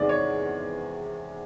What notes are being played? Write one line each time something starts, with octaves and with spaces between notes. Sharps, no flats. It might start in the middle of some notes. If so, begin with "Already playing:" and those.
Already playing: E2 C3 D#3 G#3 B3 D5
C#5